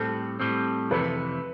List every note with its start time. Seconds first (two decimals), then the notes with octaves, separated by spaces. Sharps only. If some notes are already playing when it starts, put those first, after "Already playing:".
Already playing: A2 G3 C4 A4
0.40 A2 G3 C4
0.91 F2 C3 E3 A3 B4